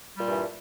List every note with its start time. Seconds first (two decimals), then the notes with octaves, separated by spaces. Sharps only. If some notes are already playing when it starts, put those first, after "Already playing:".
0.15 G3
0.20 A#2
0.25 G2
0.29 E3